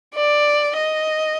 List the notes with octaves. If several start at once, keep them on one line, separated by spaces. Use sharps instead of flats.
D5
D#5